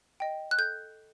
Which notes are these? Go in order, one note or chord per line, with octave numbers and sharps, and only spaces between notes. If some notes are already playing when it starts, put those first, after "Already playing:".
D#5 G5
F#6
A4 G6